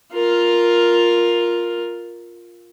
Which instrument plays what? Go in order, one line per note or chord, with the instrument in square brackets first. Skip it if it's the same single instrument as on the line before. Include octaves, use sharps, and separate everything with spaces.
[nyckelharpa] F4 A#4